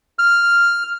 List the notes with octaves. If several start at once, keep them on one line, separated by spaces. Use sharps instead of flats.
F6